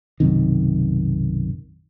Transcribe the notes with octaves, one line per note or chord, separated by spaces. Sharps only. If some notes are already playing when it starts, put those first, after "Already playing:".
B1 F#2 C3 D#3